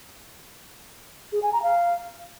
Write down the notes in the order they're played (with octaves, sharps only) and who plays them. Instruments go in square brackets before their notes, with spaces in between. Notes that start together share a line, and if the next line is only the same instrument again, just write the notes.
[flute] G#4
G#5
A#5
F5